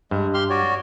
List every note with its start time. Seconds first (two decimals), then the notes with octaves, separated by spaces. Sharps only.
0.11 G2 G#3
0.34 G4 C6 F6
0.50 F#4 C#5 D5